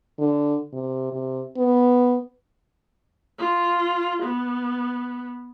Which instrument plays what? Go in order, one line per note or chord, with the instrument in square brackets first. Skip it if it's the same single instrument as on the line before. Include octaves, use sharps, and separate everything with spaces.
[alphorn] D3
C3
C3
B3
[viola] F4
B3